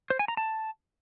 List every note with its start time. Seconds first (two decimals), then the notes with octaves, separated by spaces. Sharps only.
0.10 C5
0.19 G#5
0.28 A#5
0.37 A5